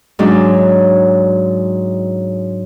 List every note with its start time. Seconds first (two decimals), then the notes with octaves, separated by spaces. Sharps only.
0.19 G#2 F#3 C#4 D4